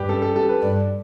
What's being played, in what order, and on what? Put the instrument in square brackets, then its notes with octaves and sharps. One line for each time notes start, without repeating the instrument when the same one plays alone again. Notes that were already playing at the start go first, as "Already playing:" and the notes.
Already playing: [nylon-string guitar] G2 [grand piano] G4 B4
[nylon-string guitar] C#4 [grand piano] A4
[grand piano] A4
[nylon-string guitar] G4 [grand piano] A4
[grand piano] B4
[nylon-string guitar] G2 [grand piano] D5